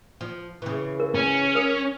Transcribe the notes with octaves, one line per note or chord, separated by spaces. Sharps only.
F3
C#3 E3
A#4
C#4
A#4 D#6